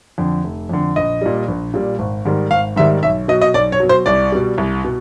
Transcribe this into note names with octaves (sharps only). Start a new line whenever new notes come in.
F2 D3
F1
F2 D3
A#1 D#5
A#2 G3
A#1
A#2 G3
G#1
G#2 D#3 G3
G#1 F5
G#2 D#3 G3 E5
B1 E5
B2 F#3 D#5
D#5
B1 D5
C#5
B2 F#3
C5
C2 D5
B2 G3
C2
B2